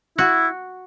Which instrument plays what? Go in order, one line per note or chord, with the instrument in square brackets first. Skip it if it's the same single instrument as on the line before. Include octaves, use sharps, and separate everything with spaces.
[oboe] E4 [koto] F#4